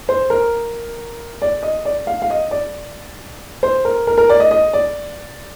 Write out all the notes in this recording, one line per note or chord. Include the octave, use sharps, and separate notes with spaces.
C5
A#4
D5
D#5
D5
F5
F5
D#5
D5
C5
A#4
A#4
A#4
D5
D#5
D#5
D5